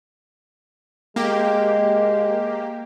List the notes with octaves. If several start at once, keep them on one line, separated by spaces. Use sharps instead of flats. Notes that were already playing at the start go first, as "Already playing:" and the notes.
G#3 A#3 G4